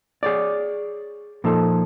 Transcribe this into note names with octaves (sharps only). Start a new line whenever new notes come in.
G#4 C#5 D5
A#2 F3 D#4 A4